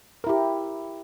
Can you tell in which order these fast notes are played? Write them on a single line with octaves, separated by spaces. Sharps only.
A#4 E4 G4